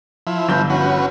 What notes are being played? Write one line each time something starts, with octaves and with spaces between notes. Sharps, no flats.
F3 E4
G1 G6
C#4 F#4 B4